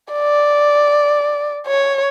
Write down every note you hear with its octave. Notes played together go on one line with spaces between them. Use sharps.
D5
C#5